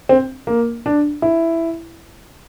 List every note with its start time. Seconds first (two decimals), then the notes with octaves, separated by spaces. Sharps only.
0.09 C4
0.47 A#3
0.86 D4
1.22 E4